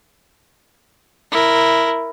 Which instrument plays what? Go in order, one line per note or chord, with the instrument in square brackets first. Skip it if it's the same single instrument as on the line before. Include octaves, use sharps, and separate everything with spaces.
[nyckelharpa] E4 A#4